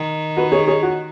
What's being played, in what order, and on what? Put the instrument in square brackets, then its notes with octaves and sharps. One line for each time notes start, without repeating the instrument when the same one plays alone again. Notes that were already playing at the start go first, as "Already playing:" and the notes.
Already playing: [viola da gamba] D#3
[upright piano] F#4 B4
G#4 C#5
G#4 C#5
F#4